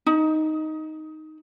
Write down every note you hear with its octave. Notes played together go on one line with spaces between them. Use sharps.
D#4